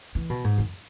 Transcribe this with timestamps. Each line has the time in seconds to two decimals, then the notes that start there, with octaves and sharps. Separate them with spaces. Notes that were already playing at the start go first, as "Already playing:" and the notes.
0.15 E3
0.30 B2
0.44 G#2
0.58 F#2